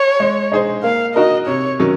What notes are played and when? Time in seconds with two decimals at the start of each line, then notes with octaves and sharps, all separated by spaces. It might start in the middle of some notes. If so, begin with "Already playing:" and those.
Already playing: C#5
0.20 G#3
0.52 D#4 G#4 C5
0.83 A#3 F5
1.15 D#4 F#4 A#4 D#5
1.47 C3 C#5
1.80 D#3 F#3 C#4